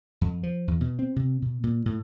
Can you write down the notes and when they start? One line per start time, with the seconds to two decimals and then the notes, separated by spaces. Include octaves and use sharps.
0.21 F2
0.43 F3
0.68 E2
0.81 B2
0.99 C4
1.16 C3
1.42 B2
1.64 A#2
1.86 A2